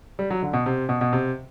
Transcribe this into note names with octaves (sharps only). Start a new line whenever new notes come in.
G3
F#3
D3
B2
C3
B2
B2
C3